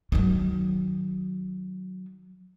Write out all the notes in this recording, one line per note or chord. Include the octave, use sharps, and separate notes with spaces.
D#3 F#3